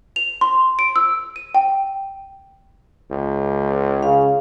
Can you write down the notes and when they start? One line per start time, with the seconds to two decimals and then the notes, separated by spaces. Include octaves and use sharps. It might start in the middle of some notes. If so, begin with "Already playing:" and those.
0.16 F7
0.41 C6
0.79 D7
0.96 E6
1.36 D#7
1.55 G5
3.11 C#2
4.03 C#3 F5